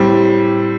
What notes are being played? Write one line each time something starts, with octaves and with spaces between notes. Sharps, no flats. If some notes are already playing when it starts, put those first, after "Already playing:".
Already playing: A2 G3 C4